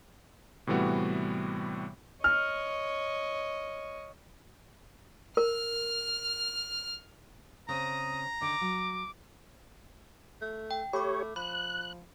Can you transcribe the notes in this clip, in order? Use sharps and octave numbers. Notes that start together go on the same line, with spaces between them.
A2 C3 E3 G3 B3 F#4
C#5 D#5 F6
A#4 F6
C#3 C4 A#5 D#6
D3 D#3 D6
F#3
A3
G5
A3 G4 C#5 B5 D6
F3 B5 F#6